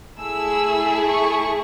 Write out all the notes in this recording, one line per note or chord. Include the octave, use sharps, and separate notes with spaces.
A3 E4 G#4 E6
C#6